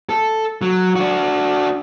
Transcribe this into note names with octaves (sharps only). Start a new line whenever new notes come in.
A4
F#3
D4 F#4